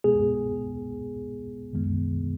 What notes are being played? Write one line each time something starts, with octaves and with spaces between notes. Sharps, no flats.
B2 G#3 B3 G#4
F#2 D#3 G#3 B3